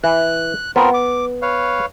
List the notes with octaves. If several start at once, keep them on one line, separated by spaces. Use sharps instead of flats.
E3 F#6
B3 C4 F4 A#4
D6
B4 C#5 F5